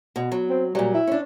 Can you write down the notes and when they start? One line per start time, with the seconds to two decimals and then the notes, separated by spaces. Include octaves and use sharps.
0.16 B2
0.32 F#3
0.50 C4
0.75 A#2 F#3 G3
0.94 E4
1.07 C#4 D4